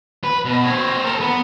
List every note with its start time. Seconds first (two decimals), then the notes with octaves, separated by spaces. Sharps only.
0.24 B4
0.45 B2
0.65 C4 C#5
1.04 A4 A#4
1.20 B3